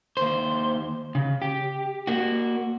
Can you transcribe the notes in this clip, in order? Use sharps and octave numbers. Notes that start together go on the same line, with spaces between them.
D#2 C5
C#3
G4
A#3 F#4